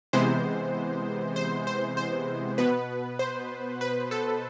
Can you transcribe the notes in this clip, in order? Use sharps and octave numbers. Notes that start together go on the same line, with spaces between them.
C3 E3 G#3 B3 C5
C5
C5
C5
B2 B3 B4
C5
B4
A4